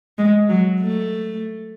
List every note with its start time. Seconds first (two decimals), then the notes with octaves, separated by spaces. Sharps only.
0.18 G#3
0.49 F#3
0.81 A3